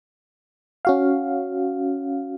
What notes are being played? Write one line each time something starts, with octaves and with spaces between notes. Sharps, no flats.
C#4 F#4 F5